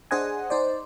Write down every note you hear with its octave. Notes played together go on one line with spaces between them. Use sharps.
D4 G#4 C5 D#5 F#5 G#5
D#4 C5 D5